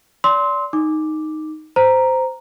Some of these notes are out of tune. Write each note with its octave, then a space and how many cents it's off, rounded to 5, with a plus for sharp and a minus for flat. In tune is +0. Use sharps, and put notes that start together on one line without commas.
D5 -30 C6 +0 E6 -35
D#4 +0 D6 +0
C5 -15 A#5 +0